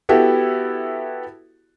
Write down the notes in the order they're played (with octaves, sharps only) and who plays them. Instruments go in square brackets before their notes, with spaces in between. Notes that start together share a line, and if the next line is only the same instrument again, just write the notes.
[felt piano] B3 E4 F#4 G4 A4